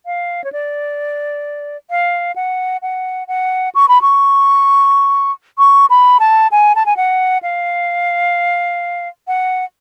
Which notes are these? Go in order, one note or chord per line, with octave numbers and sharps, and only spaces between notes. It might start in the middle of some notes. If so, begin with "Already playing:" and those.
F5
C#5
D5
F5
F#5
F#5
F#5
C#6
B5
C#6
C#6
B5
A5
G#5
A5
G#5
F#5
F5
F#5